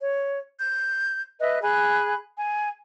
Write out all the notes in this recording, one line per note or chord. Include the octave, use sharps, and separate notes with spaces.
C#5
G6
B4 D#5 E5 F#6
G#4 G#5 B5 F#6
G#5